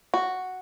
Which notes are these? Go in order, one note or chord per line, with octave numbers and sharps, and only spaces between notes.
F#4